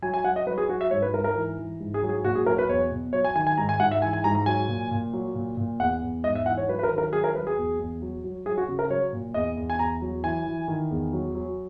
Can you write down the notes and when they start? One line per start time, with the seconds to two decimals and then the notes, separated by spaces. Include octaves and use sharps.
0.02 F#3 G#5
0.14 G#5
0.25 F#3 F#5
0.36 D#5
0.47 F#3 B4
0.58 G#4
0.69 F#3 F#4
0.81 E5
0.91 G#2 C#5
1.02 B4
1.13 G#2 A#4
1.24 A#4
1.35 E3
1.58 E3
1.80 G#2
1.94 G#4
2.03 F#3
2.09 G#4
2.24 A#2 F#4
2.35 G#4
2.46 F#3 A#4
2.58 B4
2.69 E2 C#5
2.91 B2
3.13 F#3 C#5
3.24 G#5
3.36 D#3 G#5
3.47 G#5
3.57 G#2 A#5
3.69 G#5
3.80 G#2 F#5
3.91 E5
4.02 E3 G#5
4.13 G#5
4.24 G#2 A#5
4.35 A#5
4.46 F#3 G#5
4.68 A#2
4.91 A#2
5.13 F#3
5.35 A#2
5.57 A#2
5.80 E2 F#5
6.02 E2
6.24 G#2 D#5
6.35 E5
6.46 E3 F#5
6.57 C#5
6.68 F#3 B4
6.79 B4
6.83 A#4
6.91 D#3
6.98 A#4
7.13 F#3 G#4
7.24 A#4
7.35 F#3 B4
7.47 G#4
7.58 E2
7.79 E2
8.02 F#3
8.24 F#3
8.46 F#3 G#4
8.58 F#4
8.68 C#3
8.79 A#4
8.90 F#3 C#5
9.13 A#2
9.34 E2 D#5
9.57 E2
9.70 G#5
9.79 E2 A#5
10.02 F#3
10.23 E3 G#5
10.46 E3
10.68 D#3
10.91 E2
11.13 F#3
11.35 F#3